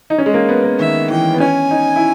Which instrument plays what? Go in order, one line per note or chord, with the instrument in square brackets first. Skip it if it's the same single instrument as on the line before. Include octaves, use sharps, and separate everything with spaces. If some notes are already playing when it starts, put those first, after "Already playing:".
[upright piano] D#4
C#4
G#3
A#3
B3
A#3
[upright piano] D#3 [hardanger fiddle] E5
[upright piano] E3 [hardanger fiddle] G5
[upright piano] B3
[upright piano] C#4 [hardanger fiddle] G#5
[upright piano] D#4
E4